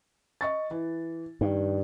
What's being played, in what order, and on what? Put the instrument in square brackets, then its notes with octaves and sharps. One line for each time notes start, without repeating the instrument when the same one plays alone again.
[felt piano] D#5 C#6 A6
E3
[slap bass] G2 [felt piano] D#3